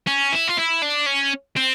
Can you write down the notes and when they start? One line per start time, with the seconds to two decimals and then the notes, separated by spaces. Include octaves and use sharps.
0.07 C#4
0.32 E4
0.48 F4
0.57 E4
0.82 D4
1.06 C#4
1.57 C4